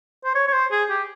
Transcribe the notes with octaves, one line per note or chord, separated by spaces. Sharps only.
C5
C#5
C#5
C5
G#4
G4